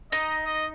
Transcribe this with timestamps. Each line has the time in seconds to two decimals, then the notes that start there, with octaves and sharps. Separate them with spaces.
0.12 D#4 D#5
0.45 D#5